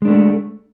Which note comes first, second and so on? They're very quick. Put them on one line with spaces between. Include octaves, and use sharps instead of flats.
G#3 D4 A3